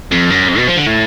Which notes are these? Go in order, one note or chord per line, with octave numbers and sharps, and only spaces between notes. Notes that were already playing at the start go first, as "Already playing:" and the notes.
F2
F#2
F2
B2
F3
D3
A2